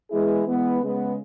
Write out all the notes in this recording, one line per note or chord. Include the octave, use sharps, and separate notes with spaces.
E3 G#3 B3 E4 G#4
E3 G#3 B3
C#3 G#3 B3